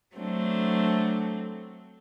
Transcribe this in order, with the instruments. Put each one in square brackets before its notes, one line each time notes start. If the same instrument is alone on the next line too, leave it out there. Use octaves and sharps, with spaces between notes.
[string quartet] F#3 A3 C4 D4